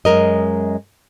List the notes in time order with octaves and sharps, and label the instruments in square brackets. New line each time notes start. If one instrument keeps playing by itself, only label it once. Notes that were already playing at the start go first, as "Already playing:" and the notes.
[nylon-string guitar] F#2 G#3 A#4 D#5